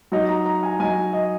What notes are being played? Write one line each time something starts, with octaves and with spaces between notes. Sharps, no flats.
F#3 D#4
A#5
A#5
G#5
F#3 D#4 G#5
D#5